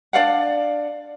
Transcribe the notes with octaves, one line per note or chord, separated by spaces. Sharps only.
D4 D5 F5 F#5